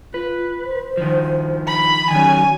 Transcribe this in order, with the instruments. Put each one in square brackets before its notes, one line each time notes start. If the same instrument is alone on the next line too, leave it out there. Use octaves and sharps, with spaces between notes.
[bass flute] F4 [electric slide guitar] B4
[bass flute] C5
[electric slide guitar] D#3 F3
[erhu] B5
[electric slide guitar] D#3 C#4 [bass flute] F#3 [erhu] G#5